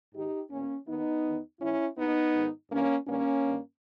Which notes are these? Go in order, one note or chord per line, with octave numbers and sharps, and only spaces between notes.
G#2 D#3 D#4 G4
E2 B2 A#3 C#4
D#2 D#3 B3 D#4
E2 D#3
G#2 E3 C#4 E4
D#2 D#3 B3 D#4
G#2 D#3
G2 E3 A#3 C#4
G2 D#3 A#3 C#4
G2 D#3